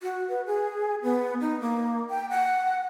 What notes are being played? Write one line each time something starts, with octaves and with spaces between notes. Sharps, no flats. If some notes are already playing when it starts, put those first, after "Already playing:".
F#4
B4
G#4
B3
D#4
A#3
G5
F#5